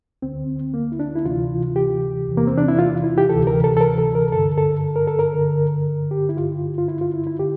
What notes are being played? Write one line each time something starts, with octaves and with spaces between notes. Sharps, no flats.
D2 D3 C4
A#3
E4
D4
E4
D2 C3 E3 F4
G4
E2 C3 E3
A#3
C4
D4
E4
F4
E4
G4
D2 C3 E3 A4
A#4
A4
A4
A#4
A4
A#4
G2 D3 A4
A4
A#4
A4
A#4
G2 D3
G4
E4
G2 D3 F4
F4
E4
F4
E4
E4
D3 G4